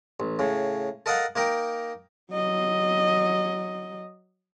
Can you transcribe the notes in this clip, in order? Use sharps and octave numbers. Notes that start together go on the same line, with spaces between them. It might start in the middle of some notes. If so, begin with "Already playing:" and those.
A1
A2 C#3
A4 A#4 D#5 F5 F#5 A5
A#3 D#4 A#4 G5
F#3 D#5